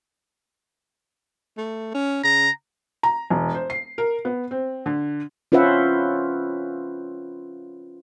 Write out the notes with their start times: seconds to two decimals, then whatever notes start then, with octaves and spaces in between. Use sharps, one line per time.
1.57 A3
1.94 C#4
2.24 C#3 A#5
3.03 A#5
3.30 E1
3.55 C5
3.70 C7
3.98 A#4
4.25 B3
4.51 C4
4.86 D3
5.52 C#4 F4 B4 C5 E5 F#5